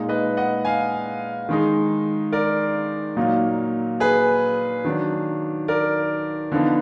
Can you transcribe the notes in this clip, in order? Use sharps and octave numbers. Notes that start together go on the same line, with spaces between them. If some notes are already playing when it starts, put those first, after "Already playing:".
Already playing: A#2 G#3 D#4
B4 D#5
D#5 F#5
F5 G#5
D#3 G#3 D#4
A#4 D5
A#2 F#3 A#3 D#4
G#4 B4
D#3 F#3 D4
A#4 D5
D3 F3 B3 D#4